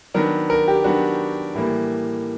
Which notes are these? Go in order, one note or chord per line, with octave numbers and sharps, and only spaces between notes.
D#3 F#3 B3 D4 A#4
A#4
G4
D#3 F#3 B3 D4 F#4
A2 E3 G3 A#3